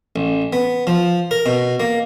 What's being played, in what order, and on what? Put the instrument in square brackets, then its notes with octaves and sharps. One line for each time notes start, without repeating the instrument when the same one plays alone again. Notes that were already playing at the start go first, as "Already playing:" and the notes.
[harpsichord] A1
B3
F3
A#4
B2
A#3